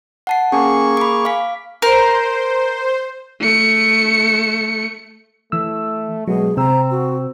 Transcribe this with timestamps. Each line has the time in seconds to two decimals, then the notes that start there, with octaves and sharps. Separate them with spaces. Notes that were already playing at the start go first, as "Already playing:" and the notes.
0.27 F#5 A5 C7
0.52 A#3 C#4 G#4 C#6
0.97 B5 D6
1.25 F5 D6 B6
1.82 A#4 C5
3.40 A3 C#7
5.52 E3 A3 E6
6.28 B2 F#3 G#3 G#4
6.57 C3 C4 C5 A#5 E6
6.91 F#4